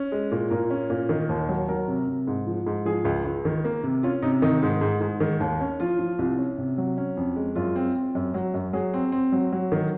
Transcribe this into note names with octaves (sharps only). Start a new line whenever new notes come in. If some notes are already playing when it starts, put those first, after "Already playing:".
Already playing: C#4
G#3
A#2
A#2 A#4
C#4
A#2
D#3
D#2
F#3
F#3 A#4
C3
C3
G#2
F3
G#2
F3 G#4
C#2
C#2
D#3
A#3
C3
C#4 F4
C3 D#4
D#3 D#4
G#2
G#2
G#2
D#3
D#2
C#4
F3 F4
F3
C2
C#4
C3
F#3
C#4
F2
G#3
F#2 F4
C4
C4
F#2
F#3
F#2
F#3 G#4
C4
C4
F#3
F#3
D#3